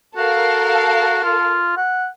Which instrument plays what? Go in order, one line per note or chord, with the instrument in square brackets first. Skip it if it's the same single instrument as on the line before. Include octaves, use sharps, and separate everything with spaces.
[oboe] F#4 [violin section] A4 A#4 F5
[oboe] F4
F#5